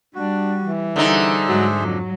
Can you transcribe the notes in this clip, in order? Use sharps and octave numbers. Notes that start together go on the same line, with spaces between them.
G3 D4 F#4
E3
D3 G3 D#4 G#4 C5 E5
G#2 F#3 G#3
F2 F#3